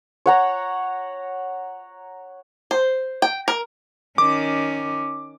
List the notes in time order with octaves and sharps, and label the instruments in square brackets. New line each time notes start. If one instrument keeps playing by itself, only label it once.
[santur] C#5 F#5 A#5
[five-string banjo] C5
G5
A#4
[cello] D#3 C#4 [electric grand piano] D6